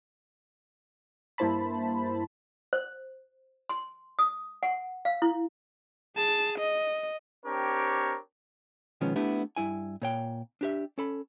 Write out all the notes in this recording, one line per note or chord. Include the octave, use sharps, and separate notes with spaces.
G2 A#3 E4 C5 A5 B5
C5
C6
D#6
F#5
F5
E4
G#4 A5
D#5
C4 D4 G4 A#4 C#5
B2 D#3 F3 G#3 B3 C#4
A3 B3 D4 E4 G4
G2 E4 G#5
A#2 C#5 G5
D4 G4 E5
C#4 A4 B5